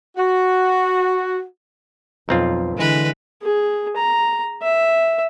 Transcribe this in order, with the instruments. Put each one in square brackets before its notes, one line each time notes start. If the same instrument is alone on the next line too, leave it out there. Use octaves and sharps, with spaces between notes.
[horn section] F#4
[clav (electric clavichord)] B1 C4 F4 [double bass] F2
[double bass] D3 E3 [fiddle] G#3 B4
[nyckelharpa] G#4
A#5
E5